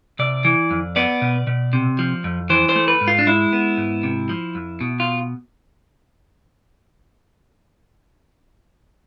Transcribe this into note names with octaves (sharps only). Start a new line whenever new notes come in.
C3 D5
E3
F2
B3 D5
B2
B2
C3
F3
F2
E3 C5
C5
A3
B4
G#2
F4
D4
G#3 E4
B3
G#2
C3
F3
F2
B2
F4